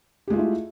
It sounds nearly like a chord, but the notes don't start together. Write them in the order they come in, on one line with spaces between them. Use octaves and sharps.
G4 G#3 F4 A3 E4